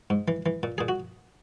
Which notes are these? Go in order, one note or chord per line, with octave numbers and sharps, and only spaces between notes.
G#2
E3
E3
A#2
A#2 G#4
F#4